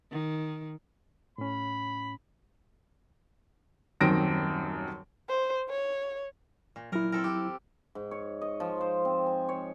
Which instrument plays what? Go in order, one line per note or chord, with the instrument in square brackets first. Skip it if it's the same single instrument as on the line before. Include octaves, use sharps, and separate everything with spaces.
[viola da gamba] D#3
[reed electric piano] A2 C#4 [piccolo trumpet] B5
[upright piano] D#1 F#2 D#3 C4 A#6 D7
[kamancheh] C5
C#5
[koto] A#2
[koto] A#2 A#4 [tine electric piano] F#3 E4
[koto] C4 A4 A#4
G4
[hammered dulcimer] G#2
C#5
D#5
F3
C5
C4
G#5
C#5